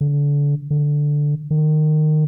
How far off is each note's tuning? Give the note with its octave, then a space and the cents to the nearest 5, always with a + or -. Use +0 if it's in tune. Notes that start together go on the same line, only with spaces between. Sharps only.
D3 -30
D3 +0
D#3 -20